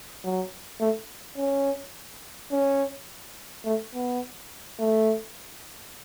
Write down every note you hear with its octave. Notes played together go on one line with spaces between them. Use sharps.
F#3
A3
C#4
C#4
A3
B3
A3